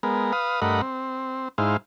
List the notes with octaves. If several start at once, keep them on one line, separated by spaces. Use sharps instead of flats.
G#3 B3 A#4
B4 F5 D#6
G2 A3 A#4 D#5 F#5 B5
C4
G#2 G#3 D#4 E4 C5 F5